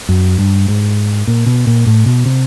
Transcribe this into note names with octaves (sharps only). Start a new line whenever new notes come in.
F#2
G2
G#2
A#2
B2
A#2
A2
B2
C3